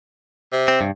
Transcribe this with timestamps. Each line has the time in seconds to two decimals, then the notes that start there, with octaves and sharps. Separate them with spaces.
0.52 C3
0.68 C4
0.81 G2